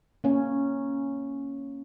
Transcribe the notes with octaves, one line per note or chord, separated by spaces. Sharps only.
A#3 C#4